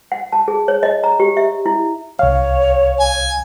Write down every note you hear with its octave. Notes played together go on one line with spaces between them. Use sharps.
F#5
A5
G#4
C#5
D#5
A#5
G4
E5
E4
C2 C#5 F5
G#5